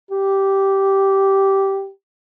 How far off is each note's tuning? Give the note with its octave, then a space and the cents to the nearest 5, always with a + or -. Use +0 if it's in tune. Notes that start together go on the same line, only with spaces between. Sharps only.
G4 -10